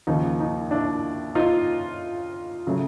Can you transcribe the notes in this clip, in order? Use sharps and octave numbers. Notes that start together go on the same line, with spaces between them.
D#2 C#3 F3 D#4
D#4
D4 E4
D#4 F4
C#3 F#3 A3